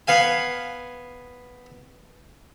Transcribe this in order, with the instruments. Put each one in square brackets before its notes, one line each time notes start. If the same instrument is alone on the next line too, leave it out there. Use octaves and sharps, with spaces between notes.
[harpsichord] B3 F5 G#5